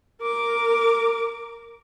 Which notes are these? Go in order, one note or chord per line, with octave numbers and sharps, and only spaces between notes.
A#4 D6